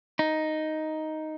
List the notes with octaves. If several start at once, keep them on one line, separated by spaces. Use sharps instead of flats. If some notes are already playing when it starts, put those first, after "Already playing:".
D#4